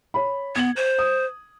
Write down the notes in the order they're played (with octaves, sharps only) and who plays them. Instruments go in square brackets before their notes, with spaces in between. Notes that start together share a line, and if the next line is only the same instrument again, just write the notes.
[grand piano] C#5 B5
[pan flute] B3 [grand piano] G#6 F#7
[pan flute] C5
[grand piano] D#6